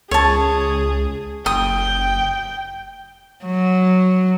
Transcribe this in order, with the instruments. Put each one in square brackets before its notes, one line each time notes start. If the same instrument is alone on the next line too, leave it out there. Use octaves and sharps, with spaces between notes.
[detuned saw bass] C#2 [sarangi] G#4 [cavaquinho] C#5 A5
[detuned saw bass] F#1 [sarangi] G5 [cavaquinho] D#6
[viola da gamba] F#3